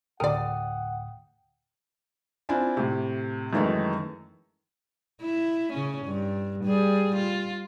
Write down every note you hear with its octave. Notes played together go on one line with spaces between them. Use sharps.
D2 A2 A#4 D5 F#5 G5 D#6
C4 D4 E4 F4 G#5
A2 C3
F#2 D#3 E3 G#3 A3
E4
C#3 C#4
G2
G3 G#4
F4